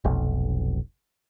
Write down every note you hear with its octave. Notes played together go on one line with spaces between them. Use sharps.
F1 B1